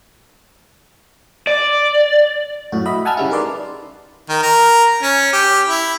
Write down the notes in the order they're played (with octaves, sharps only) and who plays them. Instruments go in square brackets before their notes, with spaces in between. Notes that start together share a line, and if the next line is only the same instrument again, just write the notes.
[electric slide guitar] D5
[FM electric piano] F#2 A2 F#4
D#5 E5 B5
F#5 G#5 A5 E6 F6 G#6
C#3 G3 E4
D#4 A#4 B4 D5 C6
[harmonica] D#3
A#4
C#4
G4
E4